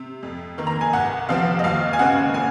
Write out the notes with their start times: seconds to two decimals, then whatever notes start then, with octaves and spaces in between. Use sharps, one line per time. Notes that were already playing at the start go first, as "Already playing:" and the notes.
Already playing: C3
0.23 F2
0.58 D#3 A#3
0.67 A#5
0.81 G#5
0.93 C2 F#5
1.29 C3 F3 C4 F5
1.59 D#5
1.64 D#2 F5
1.93 G#5
1.99 C#3 G#3 C4 F#5
2.34 A#2 G#5